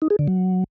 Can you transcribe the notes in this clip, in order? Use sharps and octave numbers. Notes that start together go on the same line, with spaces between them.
D#4
G#4
D3
F#3